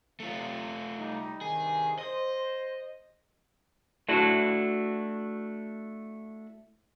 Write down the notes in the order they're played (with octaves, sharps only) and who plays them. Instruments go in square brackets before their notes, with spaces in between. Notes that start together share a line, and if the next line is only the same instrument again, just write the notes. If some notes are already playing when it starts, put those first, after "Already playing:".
[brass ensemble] C3 [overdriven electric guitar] A3 F4
[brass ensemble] G3 D#4
[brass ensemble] G2 C3 D#3 [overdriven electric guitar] G#4
[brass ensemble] C5 [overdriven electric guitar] D#5
[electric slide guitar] A3 D4 E4 F#4